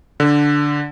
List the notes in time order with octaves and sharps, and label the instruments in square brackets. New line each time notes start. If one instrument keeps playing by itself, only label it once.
[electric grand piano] D3